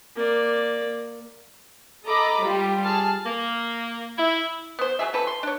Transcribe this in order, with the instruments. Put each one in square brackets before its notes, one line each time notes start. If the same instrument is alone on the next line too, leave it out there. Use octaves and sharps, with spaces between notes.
[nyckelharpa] A#3 D5
[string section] A4 D#5 A#5 B5 D6
G3 F4 G4
G#4 A5 F6
[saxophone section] A#3
E4
[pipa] B3 C5
F#3 A3 G#4 E5
F3 C#4 A4 B4
C6
D4 C#5